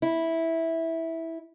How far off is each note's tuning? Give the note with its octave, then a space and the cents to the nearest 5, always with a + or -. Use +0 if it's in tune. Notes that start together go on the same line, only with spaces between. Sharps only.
E4 -10